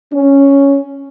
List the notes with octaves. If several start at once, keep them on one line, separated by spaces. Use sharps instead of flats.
C#4